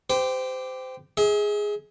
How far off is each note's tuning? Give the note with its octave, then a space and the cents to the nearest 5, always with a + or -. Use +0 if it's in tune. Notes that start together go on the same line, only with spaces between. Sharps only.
G4 +0 C5 -25
G#4 +0 E5 -45